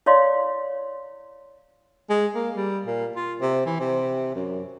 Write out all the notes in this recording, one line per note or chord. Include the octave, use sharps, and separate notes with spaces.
E4 C#5 D5 F5 C6
G#3
A#3
G3
A#2
F4
C3
E3
C3
F#2